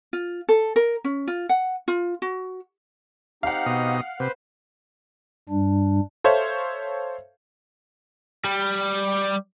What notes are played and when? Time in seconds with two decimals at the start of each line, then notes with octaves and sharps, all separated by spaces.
0.13 F4
0.49 A4
0.76 A#4
1.04 C#4
1.28 F4
1.49 F#5
1.88 F4
2.22 F#4
3.43 C4 D#4 G4 F5 F#5
3.66 B2 D#5
4.20 C3 B4 C5
5.49 G2 G3 D4
6.24 A4 C5 C#5 E5 F5
8.45 G3